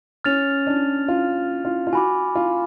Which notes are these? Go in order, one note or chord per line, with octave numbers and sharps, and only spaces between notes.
C#4 F6 A6 F7
D4
F4
F4
F4
F#4 G#5 B5 D6
F4